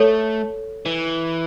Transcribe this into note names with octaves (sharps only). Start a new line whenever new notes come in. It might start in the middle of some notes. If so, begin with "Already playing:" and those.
Already playing: A3 A4 C#5
E3